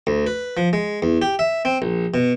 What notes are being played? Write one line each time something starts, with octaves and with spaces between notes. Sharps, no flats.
D2
B4
F3
G#3
E2
G4
E5
C4
A#1
B2